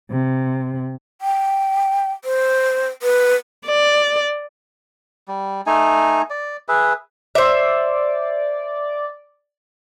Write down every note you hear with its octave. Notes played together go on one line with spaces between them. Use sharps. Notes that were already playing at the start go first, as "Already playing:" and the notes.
C3
G5
C5
B4
D5
G3
A3 D#4 G#5
D5
G#4 B4 E5
C5 D5 E5